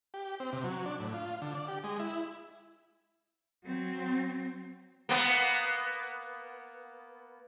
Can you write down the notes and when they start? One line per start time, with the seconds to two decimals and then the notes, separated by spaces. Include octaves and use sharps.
0.14 G4
0.40 C4
0.53 C3
0.64 F#3
0.86 D4
1.00 A2
1.14 F4
1.42 D3
1.55 D5
1.68 G4
1.84 G#3
2.00 E4
3.65 F#3 C4
5.09 A#3 B3